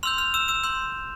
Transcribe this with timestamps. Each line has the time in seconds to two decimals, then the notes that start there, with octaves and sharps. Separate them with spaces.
0.03 C6 E6 F6 G6 F7
0.18 F6 F7
0.34 E6 E7
0.48 E6 E7
0.63 C6 E6 G6